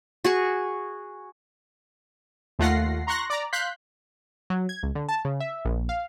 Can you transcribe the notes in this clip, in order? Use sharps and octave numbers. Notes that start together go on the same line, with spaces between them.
F#4 G#4 C#6
D#2 A3 F4 F#5 A#6 C7
A#5 C6 C#6 F#6 A#6
D5 A#5
F5 C6 F#6 G6 B6
F#3
G#6
C#2
D3
A5
C#3
E5
A#1
F5